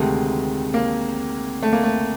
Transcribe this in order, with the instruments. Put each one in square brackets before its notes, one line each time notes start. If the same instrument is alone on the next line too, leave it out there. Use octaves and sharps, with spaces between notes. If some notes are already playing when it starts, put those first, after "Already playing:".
Already playing: [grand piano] D2 C3 D#3 G#3 [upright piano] A3
[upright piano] A#3
A3
A#3
A3